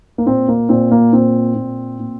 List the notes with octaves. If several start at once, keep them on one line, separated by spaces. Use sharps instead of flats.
A#3
A#2 C4
A#3
A#2 C4
A#3
A#2 C4
A#2
A#2